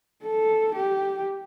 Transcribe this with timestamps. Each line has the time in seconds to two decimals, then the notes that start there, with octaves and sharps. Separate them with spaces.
0.24 A4
0.75 G4